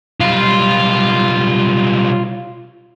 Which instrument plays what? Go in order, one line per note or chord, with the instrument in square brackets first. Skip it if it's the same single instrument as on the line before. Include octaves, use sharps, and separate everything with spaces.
[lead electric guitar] B1 G3 [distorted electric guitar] F4